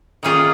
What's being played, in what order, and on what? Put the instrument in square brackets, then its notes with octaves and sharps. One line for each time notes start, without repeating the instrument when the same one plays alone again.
[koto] D#3 A#3 C#4 F4 G#4